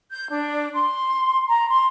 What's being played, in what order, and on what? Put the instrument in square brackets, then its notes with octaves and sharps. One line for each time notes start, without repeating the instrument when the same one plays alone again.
[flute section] G6
D4
C6
A#5
C6